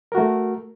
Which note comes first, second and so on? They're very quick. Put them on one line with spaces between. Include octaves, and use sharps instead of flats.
A#4 F#4 A3